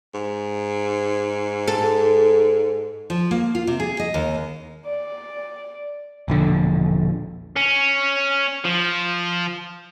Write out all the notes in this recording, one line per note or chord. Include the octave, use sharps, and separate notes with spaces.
G#2
A4
F3
A#3
F4
C3
G#4
D#5
D#2
D5
E1 A#1 D3
C#4
F3